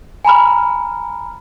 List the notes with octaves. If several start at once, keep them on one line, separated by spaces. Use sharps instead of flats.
G#5 A#5 B5 F6